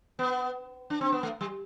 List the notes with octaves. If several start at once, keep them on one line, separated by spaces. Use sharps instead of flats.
B3
D4
C4
B3
A3
G3